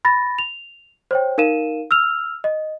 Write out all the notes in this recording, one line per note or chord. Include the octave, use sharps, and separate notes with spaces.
B5 A6 A#6
F7
C5 C#5 G5
D#4 A#4 F5 D#7 E7
E6 F6 F7
D#5